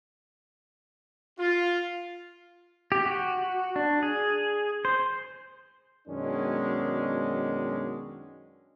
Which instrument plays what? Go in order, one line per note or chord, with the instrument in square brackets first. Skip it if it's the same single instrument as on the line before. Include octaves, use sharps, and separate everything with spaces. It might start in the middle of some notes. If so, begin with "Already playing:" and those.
[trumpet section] F4
[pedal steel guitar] G4
F#4
D4
G#4
C5
[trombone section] F#2 B2 D#3 G#3 C#4 D4